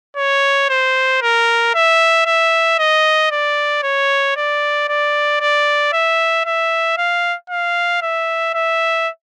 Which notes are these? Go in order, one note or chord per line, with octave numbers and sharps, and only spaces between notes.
C#5
C5
A#4
E5
E5
D#5
D5
C#5
D5
D5
D5
E5
E5
F5
F5
E5
E5